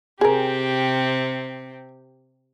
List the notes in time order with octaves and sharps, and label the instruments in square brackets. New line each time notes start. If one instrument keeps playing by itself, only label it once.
[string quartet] C3 C4 G4 [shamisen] G#4 A#4